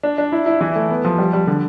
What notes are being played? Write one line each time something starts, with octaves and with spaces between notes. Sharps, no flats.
D4
D4
E4
E4
E3
A3
B3
F3
G3
G3
D3